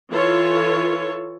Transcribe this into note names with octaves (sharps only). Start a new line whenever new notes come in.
E3 F4 A4 C#5